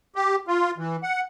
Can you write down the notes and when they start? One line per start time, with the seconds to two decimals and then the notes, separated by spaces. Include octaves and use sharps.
0.16 G4
0.48 F4
0.78 E3
1.03 F#5